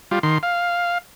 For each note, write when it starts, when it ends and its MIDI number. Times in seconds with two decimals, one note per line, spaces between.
0.11 0.19 55
0.11 0.19 65
0.23 0.38 51
0.23 0.38 84
0.43 0.98 77